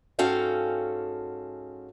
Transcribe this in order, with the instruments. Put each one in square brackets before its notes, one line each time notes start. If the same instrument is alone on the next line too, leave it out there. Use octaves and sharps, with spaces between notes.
[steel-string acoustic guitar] G#2 C#4 F#4 A4 F5 G5